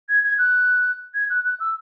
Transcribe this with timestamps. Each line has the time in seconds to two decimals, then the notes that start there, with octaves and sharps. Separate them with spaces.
0.09 G#6
0.23 G#6
0.38 F#6
1.14 G#6
1.29 F#6
1.43 F#6
1.59 E6